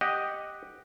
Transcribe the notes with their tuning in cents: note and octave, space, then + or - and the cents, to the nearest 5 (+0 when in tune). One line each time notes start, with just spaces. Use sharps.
G4 +0 D#5 +0 F#5 +0